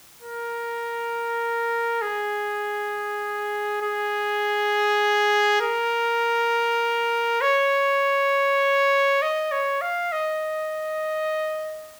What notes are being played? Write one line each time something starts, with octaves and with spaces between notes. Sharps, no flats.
A#4
G#4
G#4
A#4
C#5
D#5
C#5
F5
D#5